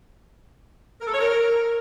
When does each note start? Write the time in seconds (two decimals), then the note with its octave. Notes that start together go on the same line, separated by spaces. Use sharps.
1.00 A#4
1.07 A4
1.14 C#5
1.21 A#4